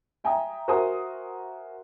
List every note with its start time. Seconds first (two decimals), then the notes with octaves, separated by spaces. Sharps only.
0.24 E5 G5 G#5 A#5 D#6
0.68 F#4 A#4 C5 E5 G#5 D#6